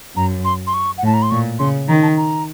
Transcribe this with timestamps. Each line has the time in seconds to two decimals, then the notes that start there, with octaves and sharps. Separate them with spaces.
0.16 F#2 A#5
0.45 C6
0.67 C6
0.74 C#6
0.98 F#5
1.03 A2 A5
1.14 A#5
1.22 C6
1.31 A#2 C#6
1.59 C#3 C6
1.88 D#3 A#5
2.02 A5
2.17 A#5